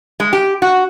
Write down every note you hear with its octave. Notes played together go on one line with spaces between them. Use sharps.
G#3
G4
F#4